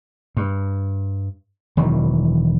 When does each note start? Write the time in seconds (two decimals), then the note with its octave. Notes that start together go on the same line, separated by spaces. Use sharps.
0.37 G2
1.77 E1 D#3 E3 F#3